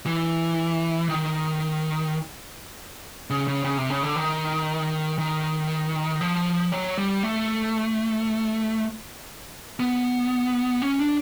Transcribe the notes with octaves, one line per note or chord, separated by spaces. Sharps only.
E3
D#3
C#3
C#3
C#3
C3
C#3
D3
D#3
D#3
F3
F#3
G3
A3
B3
C#4
D4